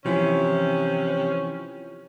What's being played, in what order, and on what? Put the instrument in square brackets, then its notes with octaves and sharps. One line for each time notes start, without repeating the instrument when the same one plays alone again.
[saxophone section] C3 C#4 [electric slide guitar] E3 F3 E4